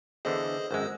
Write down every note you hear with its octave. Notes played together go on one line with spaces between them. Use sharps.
E2 D3 E3 G#4 C5 D#5
G#1 F#2 G#3 C5 E6